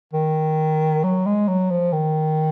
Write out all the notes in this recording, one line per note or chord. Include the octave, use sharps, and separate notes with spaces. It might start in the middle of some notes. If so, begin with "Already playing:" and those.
D#3
F#3
G#3
F#3
F3
D#3